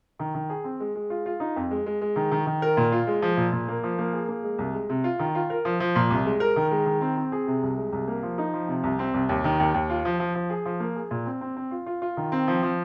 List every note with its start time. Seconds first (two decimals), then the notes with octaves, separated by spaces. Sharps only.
0.19 D#3
0.34 D#3
0.50 G#4
0.64 C4
0.80 G#3
0.95 G#3
1.10 F4
1.26 F4
1.40 D#4
1.56 F2
1.71 G#3
1.86 G#3
2.01 G#3
2.16 D#3
2.31 D#3
2.46 D#3
2.62 A#4
2.77 A#2
2.92 F4
3.07 G#3
3.22 F3
3.37 A#2
3.52 A#2
3.68 A#3
3.83 F3
3.98 A#3
4.13 G#4
4.29 A#3
4.44 G#3
4.58 C2
4.74 G#3
4.89 C3
5.04 F4
5.19 D#3
5.35 F4
5.50 A#4
5.65 F3
5.80 F3
5.95 A#2
6.10 C2
6.25 G#3
6.40 A#4
6.56 D#3
6.71 G#3
6.86 D#3
7.01 C4
7.17 C4
7.32 G#4
7.47 C3
7.63 C2
7.78 G#3
7.92 C2
8.08 A#3
8.23 F3
8.38 D#4
8.53 F3
8.68 C3
8.83 C2
8.99 C4
9.14 C2
9.29 D#2
9.44 D#3
9.60 D#2
9.74 D#2
9.90 F4
10.05 F3
10.20 F3
10.35 F3
10.50 G#4
10.65 F3
10.80 A#3
10.96 G#4
11.11 A#2
11.26 C4
11.41 C4
11.57 C4
11.71 F4
11.86 F4
12.02 F4
12.17 D#3
12.32 C4
12.48 F3
12.63 F3